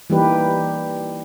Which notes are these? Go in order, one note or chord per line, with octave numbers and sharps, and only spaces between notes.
E3 G3 A#3 D#4 G4 B4